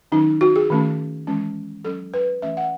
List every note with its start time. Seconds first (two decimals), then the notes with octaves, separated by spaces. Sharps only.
0.12 D#3 F#3 C#4 D#4
0.41 F#4
0.56 G#4
0.70 D#3 A3 C#4
1.27 E3 G#3 C#4
1.85 F#3 C#4 A4
2.14 B4
2.42 E3 A3 C#4 E5
2.57 F#5